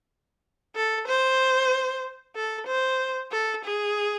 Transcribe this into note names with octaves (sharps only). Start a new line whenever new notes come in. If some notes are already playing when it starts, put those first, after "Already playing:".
A4
C5
A4
C5
A4
G#4